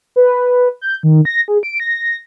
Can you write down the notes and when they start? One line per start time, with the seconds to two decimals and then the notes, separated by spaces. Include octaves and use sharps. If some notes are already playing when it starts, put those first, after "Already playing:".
0.16 B4
0.81 G6
1.03 D#3
1.25 A#6
1.48 G#4
1.63 D7
1.80 A#6